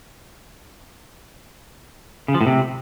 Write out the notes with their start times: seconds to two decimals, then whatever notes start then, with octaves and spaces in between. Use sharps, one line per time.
2.28 C#3
2.34 F3
2.41 A2
2.47 C3